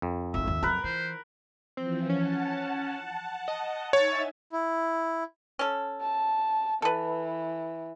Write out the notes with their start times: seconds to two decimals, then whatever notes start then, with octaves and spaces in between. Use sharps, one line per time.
0.02 F2
0.34 G#1 G#2 E5
0.47 D#2
0.63 D#3 F#3 A#4 B4
0.84 E3 C5
1.77 E3 F3 C4
2.09 C#4 F#5 A5
3.48 D#5
3.93 D#4 C#5 E5 G#5 A6
4.53 E4
5.59 C#4 A4
6.02 A5
6.82 E3 A4 B4